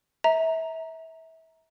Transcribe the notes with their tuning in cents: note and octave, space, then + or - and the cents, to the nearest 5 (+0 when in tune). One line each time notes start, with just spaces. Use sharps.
E5 -25 A#5 +0